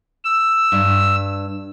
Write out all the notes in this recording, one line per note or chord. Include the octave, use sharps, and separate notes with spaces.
E6
G2